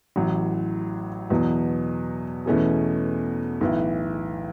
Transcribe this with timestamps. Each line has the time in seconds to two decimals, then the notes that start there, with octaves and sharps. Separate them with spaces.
0.16 A1 A2 F#3
1.30 E2 B2 F#3
2.46 E2 B2 A3 C#4 G#4
3.61 B1 A2 E3